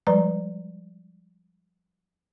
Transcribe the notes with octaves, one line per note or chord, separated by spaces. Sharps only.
F3 G3 G#3 B4 D5 A#5